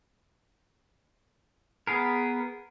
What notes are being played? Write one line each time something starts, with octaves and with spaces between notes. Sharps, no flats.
B3 G#4 A#4